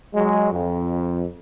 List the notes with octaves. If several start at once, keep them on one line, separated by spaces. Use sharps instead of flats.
F#3 G#3
F2